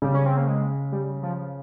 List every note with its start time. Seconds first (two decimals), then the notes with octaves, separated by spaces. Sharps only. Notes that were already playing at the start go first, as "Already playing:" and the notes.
0.02 C#3 G3
0.15 C#4
0.26 C4
0.37 A#3
0.47 G#3
0.92 G3
1.23 F3